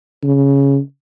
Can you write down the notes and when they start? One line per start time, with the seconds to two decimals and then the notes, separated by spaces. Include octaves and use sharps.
0.23 C#3